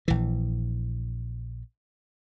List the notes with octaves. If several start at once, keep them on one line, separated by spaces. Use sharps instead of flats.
A#1 E3